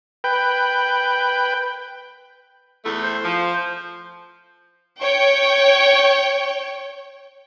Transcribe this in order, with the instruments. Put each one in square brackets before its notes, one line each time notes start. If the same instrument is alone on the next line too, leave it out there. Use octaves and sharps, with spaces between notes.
[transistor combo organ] B4 G5
[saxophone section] E2 A3
[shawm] C5
[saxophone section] F3
[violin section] C#5 G5